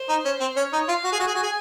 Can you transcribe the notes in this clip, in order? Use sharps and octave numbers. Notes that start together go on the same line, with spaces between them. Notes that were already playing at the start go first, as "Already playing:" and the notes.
Already playing: C5
D#4
C#4
C4
C#4 C#5
D#4
F4 F5
F#4
G#4
F#4 G#5
G#4
F#4
G#4